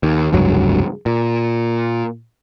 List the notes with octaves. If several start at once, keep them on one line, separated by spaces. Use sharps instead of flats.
D#2
F1 C#2 G2 F#3
A#2